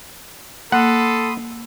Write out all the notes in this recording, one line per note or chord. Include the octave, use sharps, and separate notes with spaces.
A#3 A4 F#5 B5 C6 D#6